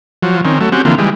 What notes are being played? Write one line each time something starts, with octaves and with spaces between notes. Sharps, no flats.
F3 F#3
D#3 C4 C#4
F#3 A3
C4 C#4 F#4 G4
D3 E3 F3 A#3 C4
E3 G3 G#3